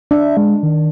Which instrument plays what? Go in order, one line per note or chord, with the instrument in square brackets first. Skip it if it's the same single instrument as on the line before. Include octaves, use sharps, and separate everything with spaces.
[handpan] D4 [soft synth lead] E5
[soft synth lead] G#3
D#3